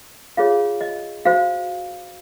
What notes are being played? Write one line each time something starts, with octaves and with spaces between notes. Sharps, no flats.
F4 G#4 C#5 F5
D#5
F#4 C5 F5